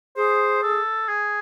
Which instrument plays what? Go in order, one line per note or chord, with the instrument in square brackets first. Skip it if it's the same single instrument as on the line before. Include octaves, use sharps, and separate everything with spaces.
[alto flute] G#4 [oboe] C5
[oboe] A4
G#4